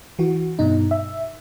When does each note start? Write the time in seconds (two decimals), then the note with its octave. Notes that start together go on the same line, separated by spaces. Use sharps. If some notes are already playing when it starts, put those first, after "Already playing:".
0.19 E3 F#4
0.59 G2 B2 D#4
0.91 E5